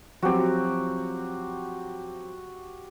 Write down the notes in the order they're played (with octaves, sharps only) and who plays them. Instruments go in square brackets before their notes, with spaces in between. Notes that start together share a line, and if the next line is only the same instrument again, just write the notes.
[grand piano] F3 F#3 C4 [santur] F#4 G4